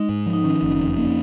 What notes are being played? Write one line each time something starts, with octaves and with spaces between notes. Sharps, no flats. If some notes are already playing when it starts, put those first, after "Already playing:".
Already playing: G#3 D#4
G#2
F3
D#4
D#3 C#4
F#1
F2
A#3